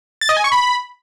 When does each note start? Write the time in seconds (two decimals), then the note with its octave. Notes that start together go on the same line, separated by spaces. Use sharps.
0.21 A6
0.29 D#5
0.37 G#5
0.44 C#6
0.52 B5